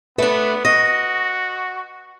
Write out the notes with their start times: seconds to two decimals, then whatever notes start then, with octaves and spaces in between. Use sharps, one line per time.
0.18 A3 B3 D4 B4
0.65 F#4 D#5